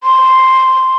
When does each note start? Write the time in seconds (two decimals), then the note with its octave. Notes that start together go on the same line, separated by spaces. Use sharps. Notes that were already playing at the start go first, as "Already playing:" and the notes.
0.03 C6